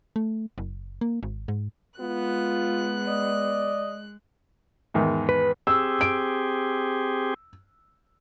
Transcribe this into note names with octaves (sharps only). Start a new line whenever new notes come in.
A3
F#1
A#3
G#1
G#2
G#3 B3 F4 F#6
D5 D#5
E2 G#2 D#3
B4
C4 G4 G#4 E6
D7